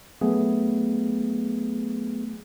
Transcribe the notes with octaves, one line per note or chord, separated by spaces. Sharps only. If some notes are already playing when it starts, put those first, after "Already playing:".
F#3 A3 B3 G#4